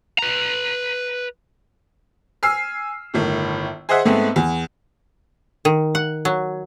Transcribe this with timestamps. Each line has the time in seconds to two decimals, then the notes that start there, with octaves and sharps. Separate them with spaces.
0.19 B4 A#5
2.43 G#5 E6 F6 C7
3.14 G1 A2 D#3
3.89 G#4 C5 D#5 E5 F#5 G#5
4.05 G#2 G#3 A3 B3 C4
4.36 E2
5.65 D#3
5.95 F#5
6.25 F#3